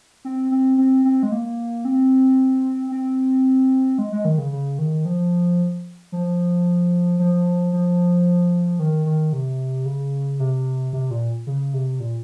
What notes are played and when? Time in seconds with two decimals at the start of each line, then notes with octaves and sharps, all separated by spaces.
0.25 C4
0.51 C4
0.78 C4
1.05 C4
1.23 G#3
1.32 A#3
1.85 C4
2.92 C4
3.98 G#3
4.12 G#3
4.25 D#3
4.38 C#3
4.52 C#3
4.79 D#3
5.05 F3
6.12 F3
7.19 F3
7.73 F3
8.80 D#3
9.06 D#3
9.33 C3
9.86 C#3
10.39 C3
10.93 C3
11.11 A#2
11.47 C#3
11.74 C3
12.00 A#2